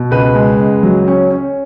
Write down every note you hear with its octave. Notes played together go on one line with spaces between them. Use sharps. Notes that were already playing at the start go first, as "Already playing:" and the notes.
Already playing: B2
C#2 B4
G#3
C#2
F#3
C#4
C#4